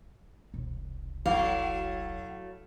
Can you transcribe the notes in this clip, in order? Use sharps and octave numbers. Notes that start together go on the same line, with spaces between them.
E1 C2
F#3 A3 E4 F5